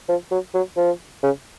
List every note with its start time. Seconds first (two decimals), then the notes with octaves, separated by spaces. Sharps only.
0.09 F3
0.31 F#3
0.54 F#3
0.77 F3
1.23 C#3